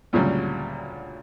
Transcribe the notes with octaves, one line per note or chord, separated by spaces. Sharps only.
D2 A#2 C#3 F#3 G3